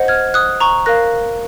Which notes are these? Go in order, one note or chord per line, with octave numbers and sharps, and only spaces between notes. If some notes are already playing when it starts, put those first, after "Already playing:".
Already playing: C5 D#5 F#5
F6 G#6
D#6 F#6
A#5 C#6
A#4 F5 F#6 A#6